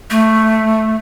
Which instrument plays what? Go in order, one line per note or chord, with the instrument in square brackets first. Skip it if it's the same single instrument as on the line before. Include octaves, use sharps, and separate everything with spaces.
[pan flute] A3